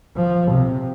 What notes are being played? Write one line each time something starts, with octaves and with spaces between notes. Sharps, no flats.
F3
C3